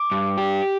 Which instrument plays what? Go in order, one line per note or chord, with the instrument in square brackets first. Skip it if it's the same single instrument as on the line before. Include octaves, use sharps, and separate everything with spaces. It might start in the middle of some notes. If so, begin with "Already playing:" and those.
Already playing: [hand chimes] D6
[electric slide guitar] G2
G4